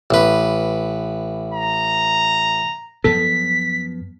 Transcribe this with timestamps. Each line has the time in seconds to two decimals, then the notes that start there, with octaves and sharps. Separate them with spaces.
0.11 A1 B4
1.54 A#5
3.04 F#2 F3 B3 A4 B6